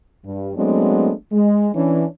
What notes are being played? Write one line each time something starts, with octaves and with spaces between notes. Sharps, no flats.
G2
F#3 G#3 A3 B3 C4 D4
G#3
E3 C#4 D4